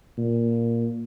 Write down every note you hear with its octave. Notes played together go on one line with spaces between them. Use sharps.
A#2